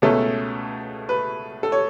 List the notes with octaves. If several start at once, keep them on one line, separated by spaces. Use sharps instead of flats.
C#2 B2 A3 C#4 A4
B4
A4
C#5